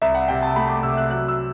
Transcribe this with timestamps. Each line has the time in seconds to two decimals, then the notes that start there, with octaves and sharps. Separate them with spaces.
0.02 C2 E5
0.15 F#5
0.28 C3 G5
0.43 A5
0.56 A3 B5
0.70 D6
0.83 C3 E6
0.97 F#6
1.10 F#3 F#6
1.28 E6